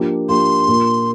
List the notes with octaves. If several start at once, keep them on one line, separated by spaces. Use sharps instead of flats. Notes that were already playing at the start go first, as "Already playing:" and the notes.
Already playing: F3 A#3 D4 G4
F3 A#3 D4 G4 C6
A#2 A#3 F4 A#4